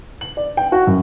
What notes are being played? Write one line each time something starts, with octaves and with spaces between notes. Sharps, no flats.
F#7
D5
G5
F#4
F#2